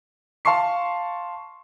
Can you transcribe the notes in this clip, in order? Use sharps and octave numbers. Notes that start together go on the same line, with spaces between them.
F5 A5 C6 C#6 C7